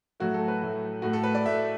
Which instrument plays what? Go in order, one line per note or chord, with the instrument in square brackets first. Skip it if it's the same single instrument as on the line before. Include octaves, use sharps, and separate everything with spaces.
[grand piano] A2 F#3 A3 F#4
A4
B4
A2 F#3 A3
A2 A3 F#4
A4
B4
D5
A2 A3 E5